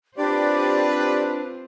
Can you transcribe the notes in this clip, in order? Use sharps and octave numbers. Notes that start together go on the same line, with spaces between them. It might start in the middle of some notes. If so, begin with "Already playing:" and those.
C4 D4 F4 G4 B4 C5 D5